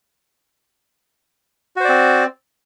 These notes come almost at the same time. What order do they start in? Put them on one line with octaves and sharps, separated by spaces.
F#4 C5 D5 C4